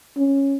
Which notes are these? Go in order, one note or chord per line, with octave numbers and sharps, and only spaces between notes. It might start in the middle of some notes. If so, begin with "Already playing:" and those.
C#4